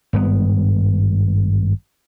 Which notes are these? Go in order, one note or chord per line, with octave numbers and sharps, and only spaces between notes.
G#1 G2 B3